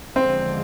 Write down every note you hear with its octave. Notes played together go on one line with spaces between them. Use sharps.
E2 D3 F3 G#3 C4